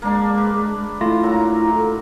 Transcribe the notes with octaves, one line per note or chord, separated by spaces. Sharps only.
G#3 A#3 D4
B4
A3 E4 F4 A#6
F#3 A#3 A#5
A4